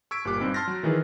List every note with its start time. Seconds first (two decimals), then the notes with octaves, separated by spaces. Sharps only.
0.11 C#6 E6 G#6 B6 D7
0.25 G1 A#2 G4 D6 F#6
0.40 G2 C4 D#4
0.54 A5 C6 F6 G6 A6 A#6
0.68 F#3
0.83 D#3 E3 F#3 G#4 B4